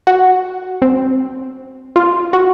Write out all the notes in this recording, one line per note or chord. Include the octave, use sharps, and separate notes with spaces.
F#4
C4
F4
F#4